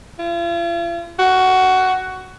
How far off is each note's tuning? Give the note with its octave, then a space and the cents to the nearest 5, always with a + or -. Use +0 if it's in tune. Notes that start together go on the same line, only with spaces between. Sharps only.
F4 -45
F#4 +15